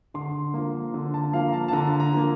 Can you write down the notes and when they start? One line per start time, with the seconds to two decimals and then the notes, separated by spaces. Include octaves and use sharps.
0.14 D3 C6
0.54 F3 A#3
0.94 D3
1.14 A5
1.33 F3 A#3 F5
1.48 A#5
1.53 A5
1.68 A5
1.73 D3 A#5
2.00 A#5
2.13 F3 A#3